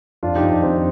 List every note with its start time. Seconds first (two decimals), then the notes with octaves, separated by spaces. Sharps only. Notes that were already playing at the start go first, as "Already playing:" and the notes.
0.23 F2 D4 F4
0.35 D#4 G4
0.43 F2
0.49 D4 F4
0.62 D#3 C4 D#4